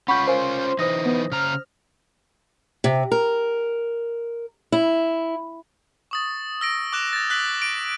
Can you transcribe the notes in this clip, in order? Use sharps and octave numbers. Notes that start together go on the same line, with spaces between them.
C#4 F4 F#5 B5 C#6 G6
A#4 C5 F5 G#5
E3 D#4 C5 D#6 A#6
B3
C#3 A#5 F6
C3
A#4
E4
C#6 D#6 A6
E6 A#6 D7
D6 F#6 E7
G#6 A6
E6 F#6 B6 F#7
D7